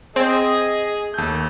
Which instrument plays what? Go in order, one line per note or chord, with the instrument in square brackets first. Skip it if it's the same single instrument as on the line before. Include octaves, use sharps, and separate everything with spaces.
[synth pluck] C4 [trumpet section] G#4 [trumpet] D#5
[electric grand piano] D#2 G6 [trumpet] A3